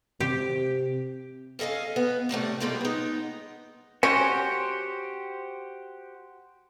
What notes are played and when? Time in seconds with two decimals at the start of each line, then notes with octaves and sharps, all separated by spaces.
0.20 C3 G4
1.59 C#4 A4 D#5 F5 G#5
1.96 B3
2.29 A2 C3 G3 A3
2.60 B2 G3 G#3 A#3 F4 G4
2.81 B3 D#4
4.03 C#4 F#4 G4 C5